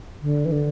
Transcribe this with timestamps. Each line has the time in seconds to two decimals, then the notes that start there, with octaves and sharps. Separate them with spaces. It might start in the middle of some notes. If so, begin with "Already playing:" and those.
0.22 D3
0.45 E3
0.52 D3